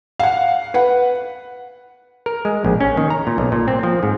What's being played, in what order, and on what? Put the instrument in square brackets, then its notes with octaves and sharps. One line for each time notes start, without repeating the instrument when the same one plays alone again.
[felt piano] F5 F#5
B4 F#5
[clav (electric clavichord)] A#4
G#3
A#1
C#4
D#3
A#5
A#2
B1
A#2
C4
F3
G#2